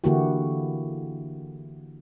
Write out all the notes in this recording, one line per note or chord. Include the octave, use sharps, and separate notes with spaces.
D3 E3 A#3 E4 F#4 G4